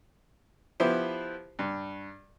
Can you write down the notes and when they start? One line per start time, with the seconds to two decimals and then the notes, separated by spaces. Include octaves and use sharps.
0.80 F3 B3 E4 G4 B4 C5
1.59 G2